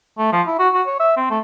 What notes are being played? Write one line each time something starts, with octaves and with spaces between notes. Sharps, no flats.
A3
F3
E4
F#4
F#4
C#5
E5
C4
A3